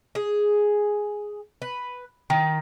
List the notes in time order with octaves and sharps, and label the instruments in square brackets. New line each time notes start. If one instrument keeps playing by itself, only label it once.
[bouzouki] G#4
B4
D#3